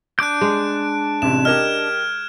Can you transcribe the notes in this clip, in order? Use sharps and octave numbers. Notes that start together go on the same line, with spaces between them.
D4 D6 F#6 G6 D7
G#3
A1 C3 E7
G4 A#4 D#5 F6 G#6 E7